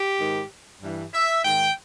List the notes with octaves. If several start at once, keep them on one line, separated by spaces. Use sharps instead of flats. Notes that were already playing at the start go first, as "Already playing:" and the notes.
Already playing: G4
G#2 D#3
G2 E3
E5
G#2 D#3 G5